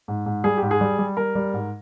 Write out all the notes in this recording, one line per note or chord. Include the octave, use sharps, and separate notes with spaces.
G#2
G#2
G3 G#4
G#2 G4
G#4
G3
G3
G3 A#4
G3
G#2